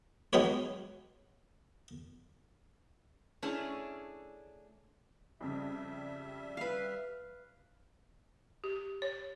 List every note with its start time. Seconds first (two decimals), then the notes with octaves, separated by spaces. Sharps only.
0.33 F#3 G#3 D#4 F#4 B4 C#5
3.42 A3 C#4 D4 E4 G#4
5.41 F2 C#3 G3 E5
6.57 B4 F5
8.64 G4
9.02 C#5